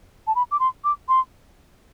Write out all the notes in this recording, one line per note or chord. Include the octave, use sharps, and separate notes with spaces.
A5
B5
D6
C6
D6
C6